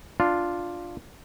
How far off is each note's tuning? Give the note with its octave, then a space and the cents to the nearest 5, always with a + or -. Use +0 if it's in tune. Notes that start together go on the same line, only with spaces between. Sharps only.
D4 +0 F4 +0